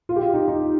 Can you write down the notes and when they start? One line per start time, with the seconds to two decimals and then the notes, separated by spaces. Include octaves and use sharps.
0.09 F4
0.16 G4
0.21 F4
0.34 D#4
0.48 D#4